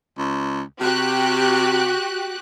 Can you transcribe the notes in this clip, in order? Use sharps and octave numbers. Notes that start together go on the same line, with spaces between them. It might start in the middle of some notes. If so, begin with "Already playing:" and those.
C#2
C3 F#4 G4 F#6